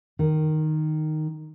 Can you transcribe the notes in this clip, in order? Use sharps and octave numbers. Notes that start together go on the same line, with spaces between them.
D#3